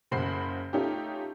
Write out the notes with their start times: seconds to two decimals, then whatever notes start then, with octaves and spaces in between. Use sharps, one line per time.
0.11 F#1 C#3 C5 F#5 B5 C7
0.73 A3 C#4 D#4 F4 G4